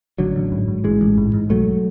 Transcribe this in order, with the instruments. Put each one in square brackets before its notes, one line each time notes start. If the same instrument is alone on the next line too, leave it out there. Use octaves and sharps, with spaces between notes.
[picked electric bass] A1 D3 F#3
A1
G#2
G#2
A1 E3 G#3
A1
G#2
G#2
B1 F#3 A3